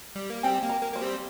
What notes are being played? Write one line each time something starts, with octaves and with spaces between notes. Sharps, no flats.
G3
A#3
G3 C4 G5
A#3
A#5
A#3
A#3 C5
G3 C4